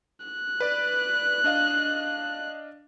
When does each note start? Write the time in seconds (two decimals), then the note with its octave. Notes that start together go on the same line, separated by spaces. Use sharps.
0.26 F#6
0.60 B4 D5
1.44 D4 D#5 F5